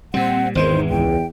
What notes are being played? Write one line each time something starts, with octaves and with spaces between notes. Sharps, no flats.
A#2 G3 C4 F#5
G#1 E2 D#3 E3 G#3 C5
C#2 G5